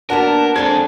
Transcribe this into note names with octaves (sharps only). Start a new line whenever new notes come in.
A#3 B3 D4 F#4 A#4 A5
G#3 C4 D4 G#4 A4 G#6